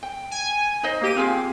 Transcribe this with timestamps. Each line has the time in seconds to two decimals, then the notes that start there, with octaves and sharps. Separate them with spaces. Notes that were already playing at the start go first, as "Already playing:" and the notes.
0.03 G5
0.31 G#5
0.83 D#4 C5 D#5
1.01 A#3 G4 D#7
1.16 C4 F4 G#4 F5